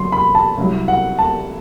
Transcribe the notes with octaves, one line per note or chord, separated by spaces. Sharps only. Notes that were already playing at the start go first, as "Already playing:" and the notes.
Already playing: F#2 D3 F#3 C6
B5
A5
C2 C3 F#3
F#5
A5